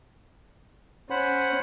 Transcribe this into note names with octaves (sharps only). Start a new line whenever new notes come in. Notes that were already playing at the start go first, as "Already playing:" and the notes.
C#4 C5 F#5 B5